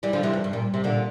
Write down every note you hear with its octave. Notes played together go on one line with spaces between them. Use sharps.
E3 G3
D3 F3
C3 E3
F2
G2
A#2
C3
A#2 D3